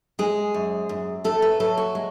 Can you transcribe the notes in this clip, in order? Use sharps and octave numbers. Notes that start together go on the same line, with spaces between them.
G#3 G#4
F#2
F#2
A3 A4
B4
F#3 A4
F#4
G#3